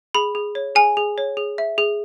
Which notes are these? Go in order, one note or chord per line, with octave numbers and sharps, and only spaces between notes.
G#4 B5
G#4
C#5
G#4 G#5
G#4
C#5
G#4
E5
G#4